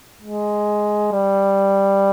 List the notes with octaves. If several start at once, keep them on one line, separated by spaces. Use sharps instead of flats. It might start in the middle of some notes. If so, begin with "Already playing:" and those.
G#3
G3